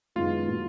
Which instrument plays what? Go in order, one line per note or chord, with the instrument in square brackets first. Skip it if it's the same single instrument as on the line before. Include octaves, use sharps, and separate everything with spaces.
[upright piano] F#2 D#3 G#3 B3 [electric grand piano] F4
[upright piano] A#2 F#3 A#3